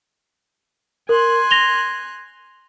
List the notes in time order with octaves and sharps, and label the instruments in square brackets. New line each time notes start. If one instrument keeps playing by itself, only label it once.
[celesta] A#4 [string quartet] G#5 C6 F#6
[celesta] A#6 F7 G7